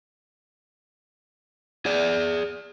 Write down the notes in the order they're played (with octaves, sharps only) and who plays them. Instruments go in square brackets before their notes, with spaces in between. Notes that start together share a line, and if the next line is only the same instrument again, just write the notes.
[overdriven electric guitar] G#4 D5